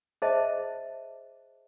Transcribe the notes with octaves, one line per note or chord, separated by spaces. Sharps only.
G#4 C5 D#5 E5 A5